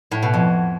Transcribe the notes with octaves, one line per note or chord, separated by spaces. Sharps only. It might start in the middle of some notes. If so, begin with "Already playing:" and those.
A2
B2
F2